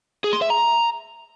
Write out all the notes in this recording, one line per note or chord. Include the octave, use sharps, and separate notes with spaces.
G#4
C6
E5
A#5